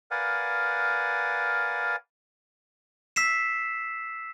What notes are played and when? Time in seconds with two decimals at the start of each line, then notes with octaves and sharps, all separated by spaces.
0.11 A#4 B4 D5 F5 F#5 G#5
3.16 E6 B6 C7 E7